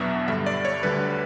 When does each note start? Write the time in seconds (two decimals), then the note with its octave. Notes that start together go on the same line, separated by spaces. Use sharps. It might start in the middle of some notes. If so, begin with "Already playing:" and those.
Already playing: E2 B2 F#3 B3 D4 E5
0.28 G2 D3 G3 E5
0.46 D5
0.65 C#5
0.83 D2 D3 G3 B4